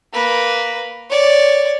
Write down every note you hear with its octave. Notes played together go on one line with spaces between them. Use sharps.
A#3 B4
C#5 D5